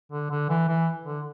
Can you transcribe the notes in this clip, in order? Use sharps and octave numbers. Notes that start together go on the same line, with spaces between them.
D3
D3
E3
E3
D3